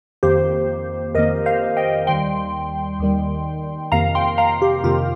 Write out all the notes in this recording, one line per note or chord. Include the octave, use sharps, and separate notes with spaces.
F2 D#3 A#3 G4 C5
F2 D#3 A#3 A#4 D#5
C5 F5
D#5 G5
D#2 D#3 G3 G5 C6
D#2 D#3 G3
F2 C3 D#3 A#3 F5 A#5
G5 C6
F5 A#5
G4
F2 C3 D#3 A#3 F4